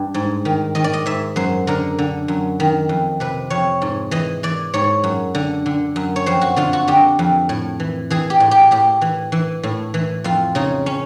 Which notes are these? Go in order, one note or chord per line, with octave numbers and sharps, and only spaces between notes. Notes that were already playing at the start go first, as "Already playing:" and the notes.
Already playing: G2
G#2
D#3
D#3 D#5
D5
D#5
G#2 E5
F#2 C5
D3 A#4
D3
F#2
D#3
F2
C3 B4
F2 C#5
G#2
E3 D#5
E3 D5
G#2 C#5
F#2
D3
D3
F#2
C#5
F2 C5
F#4
D3 F4
F#4
D3 G4
F2
A2
E3
E3 G#4
G4
A2
G4
A2 G4
E3
E3
A2
E3
F2 F4
C#3 D#4
C#4